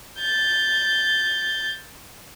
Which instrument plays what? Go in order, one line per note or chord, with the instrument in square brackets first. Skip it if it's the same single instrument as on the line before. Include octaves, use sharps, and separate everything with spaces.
[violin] G6 A6